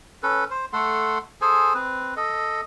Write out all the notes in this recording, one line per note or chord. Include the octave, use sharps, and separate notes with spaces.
C#4 A4 B4
C5
A3 A4 F#5 C6
G#4 A4 C5 G#5
C4 B4
A4 D#5